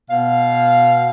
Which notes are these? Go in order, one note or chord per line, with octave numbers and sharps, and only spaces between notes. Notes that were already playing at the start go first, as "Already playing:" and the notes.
B2 F5